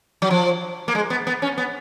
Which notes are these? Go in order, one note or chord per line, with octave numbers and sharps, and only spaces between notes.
F#3
F3
A#3
G#3
B3
B3
C#4
B3